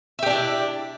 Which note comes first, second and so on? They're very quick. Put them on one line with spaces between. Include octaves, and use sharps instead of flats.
E5 G4 D4 E4